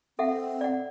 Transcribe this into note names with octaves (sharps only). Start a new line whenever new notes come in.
C4 A4 E5 F#5
D5 F#5